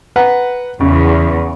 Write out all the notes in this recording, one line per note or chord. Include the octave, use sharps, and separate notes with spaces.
B4 F#5 A#5
E2 C#3